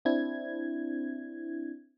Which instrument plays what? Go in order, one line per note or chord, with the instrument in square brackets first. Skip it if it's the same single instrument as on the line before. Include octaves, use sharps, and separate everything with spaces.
[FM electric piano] C4 D4 E4 G#6